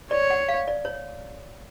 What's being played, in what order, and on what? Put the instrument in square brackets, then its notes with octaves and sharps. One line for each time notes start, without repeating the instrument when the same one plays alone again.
[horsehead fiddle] C#5 [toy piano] D5
[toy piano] F#5
F5
D5
C#5